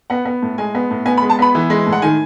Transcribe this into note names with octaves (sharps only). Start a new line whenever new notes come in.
B3 F#5
B3
A2
G#3 G#5
B3
A2
B3 G#5
B5
G#3
A5
B3 B5
E3
G#3
A2
F#5
D#3 G#5